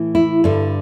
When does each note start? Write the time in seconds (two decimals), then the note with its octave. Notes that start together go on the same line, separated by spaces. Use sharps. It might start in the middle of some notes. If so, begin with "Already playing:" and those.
Already playing: A2 E3
0.15 E4
0.44 G2 D3